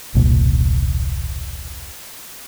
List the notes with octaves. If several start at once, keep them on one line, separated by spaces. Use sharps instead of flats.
E1 C2 A#2